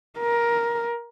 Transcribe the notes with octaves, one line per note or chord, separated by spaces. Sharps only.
A#4